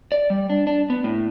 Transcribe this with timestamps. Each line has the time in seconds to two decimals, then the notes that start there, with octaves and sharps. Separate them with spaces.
0.12 D5
0.30 G3
0.50 D4
0.67 D4
0.90 B3
1.04 A2